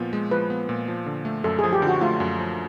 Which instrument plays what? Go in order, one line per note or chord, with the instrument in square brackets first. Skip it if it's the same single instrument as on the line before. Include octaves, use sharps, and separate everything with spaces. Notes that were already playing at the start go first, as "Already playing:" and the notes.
Already playing: [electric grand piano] A#2 F3 B3
G#3
[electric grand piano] F3 [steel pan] B4
[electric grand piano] B3
A#2
F3
D3
A3
[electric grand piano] F#2 [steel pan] A4
[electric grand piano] F3 [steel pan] G#4
[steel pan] G4
[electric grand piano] D3
[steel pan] F#4
[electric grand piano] A3 [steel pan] F4
[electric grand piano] F#2
F3